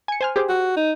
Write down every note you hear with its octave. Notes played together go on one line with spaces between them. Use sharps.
G#5 C#7
C5 G#5 F6
G4 G#4 C5
F#4
D#4